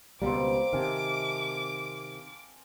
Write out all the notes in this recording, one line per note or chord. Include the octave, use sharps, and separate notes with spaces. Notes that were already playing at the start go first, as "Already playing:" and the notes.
C#2 B2 G3 A#3 C4 D6
C3 D#3 F5 G#5 A5